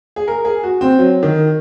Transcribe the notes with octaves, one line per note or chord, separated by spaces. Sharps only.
G#4
A#4
G#4
F#4
C4
F#3
D#3